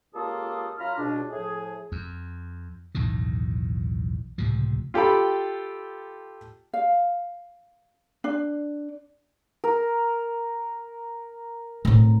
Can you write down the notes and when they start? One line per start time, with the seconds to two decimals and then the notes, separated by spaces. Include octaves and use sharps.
0.14 C#2 A#3 F4 G4 A4 D#6
0.78 F#2 F4 A#5 B5 F6
0.97 C#2 B2 D4
1.31 A2 F3 G#4
1.92 F2
2.95 B1 E2 A2 D#3
4.38 C#2 A2 C3 F3
4.94 F4 G4 A4 G5 B5
6.73 F5
8.24 D4
9.64 A#4
11.85 A2 C4